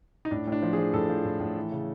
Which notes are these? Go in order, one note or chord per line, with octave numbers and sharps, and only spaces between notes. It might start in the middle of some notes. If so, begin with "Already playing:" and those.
D#4
A2 D4
A2
D4
F3
G#4
F3
A2 A4
F3
A2
A2
E3
C#3